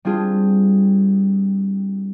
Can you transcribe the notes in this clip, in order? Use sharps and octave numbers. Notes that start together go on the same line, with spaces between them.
G3 C4 D4 F4 G#4